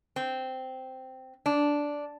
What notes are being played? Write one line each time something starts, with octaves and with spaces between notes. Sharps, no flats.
C4
D4